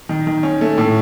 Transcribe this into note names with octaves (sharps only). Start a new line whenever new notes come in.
D#3
D#3
C#4
A3
A2